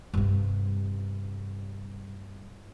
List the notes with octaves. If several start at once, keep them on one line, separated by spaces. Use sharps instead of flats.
G2 C3